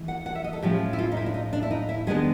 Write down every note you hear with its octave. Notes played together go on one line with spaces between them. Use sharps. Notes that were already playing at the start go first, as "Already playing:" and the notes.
Already playing: E3 G#3
F#5
F#5
E5
D#5
A4
A2 F3 G#3 C#4 G4
E4
F4
D#4
E4
D4
D#4
D4
E4
D#4
E4
D#3 G#3 B3 D4 G#4